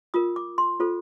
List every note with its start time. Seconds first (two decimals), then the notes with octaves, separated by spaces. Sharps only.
0.14 F4 A#4 D#6
0.36 D6
0.58 C6
0.80 F4 A4 C5